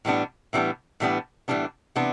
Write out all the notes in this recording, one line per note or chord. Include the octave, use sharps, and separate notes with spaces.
A2 E3 G3 B3 D4
A2 E3 G3 B3 D4
A2 E3 G3 B3 D4
A2 E3 G3 B3 D4
C3 E3 B3 D4